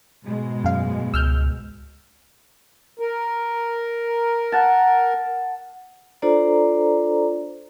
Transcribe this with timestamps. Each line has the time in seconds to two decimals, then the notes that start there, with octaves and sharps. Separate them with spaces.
0.25 G#2 B2 G#3
0.64 F#2 F5
1.14 C#2 E6 F6 G6
2.99 A#4
4.52 F#5 A5
6.22 D4 F4 A4 C5 D5 A#5